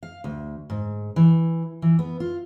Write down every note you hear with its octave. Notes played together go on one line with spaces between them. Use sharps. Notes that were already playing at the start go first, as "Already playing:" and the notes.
F5
D2
G#2
E3
E3
B3
F4